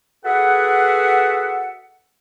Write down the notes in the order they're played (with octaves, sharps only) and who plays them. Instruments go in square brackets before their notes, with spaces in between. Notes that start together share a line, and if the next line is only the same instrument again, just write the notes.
[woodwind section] F#4 G#4 A4 B4 E5 F#5